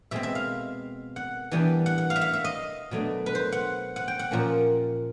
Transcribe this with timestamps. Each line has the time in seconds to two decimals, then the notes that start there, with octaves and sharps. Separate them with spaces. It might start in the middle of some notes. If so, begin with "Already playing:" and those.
0.11 B2 G#3 C4 E5
0.23 E5
0.35 F5
1.16 F#5
1.51 E3 G3 B3 D4
1.86 F#5
1.98 F#5
2.10 F5
2.16 E5
2.21 F5
2.33 E5
2.44 D#5
2.91 B2 F#3 A3 D4
3.26 B4
3.35 C5
3.52 F#5
3.96 F#5
4.08 G5
4.19 F#5
4.31 A#2 F3 A#3 C#4